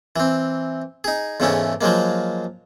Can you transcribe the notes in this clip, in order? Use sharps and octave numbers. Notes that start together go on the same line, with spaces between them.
E3 C4
D#4 G#4
E2 G#2 C#3 E3 A3 C#4
F3 F#3 G#3 A#3